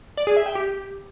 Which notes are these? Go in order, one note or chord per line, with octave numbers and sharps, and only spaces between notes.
D5
G#4
E5
G5
G4